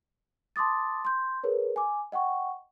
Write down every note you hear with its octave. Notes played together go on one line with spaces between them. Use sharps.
A5 C6 D6 D#6 A6
C6 G6
G#4 A#4 B4 C#5
G#5 D6
D#5 F#5 G5 C#6